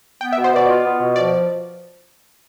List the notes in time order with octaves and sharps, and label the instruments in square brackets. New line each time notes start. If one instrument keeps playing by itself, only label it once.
[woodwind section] B3 [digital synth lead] G5
[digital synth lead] E5
[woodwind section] B2
[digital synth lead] C5
[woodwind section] B2 [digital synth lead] D5
[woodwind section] F4
B3
B2
[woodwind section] F3 [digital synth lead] D5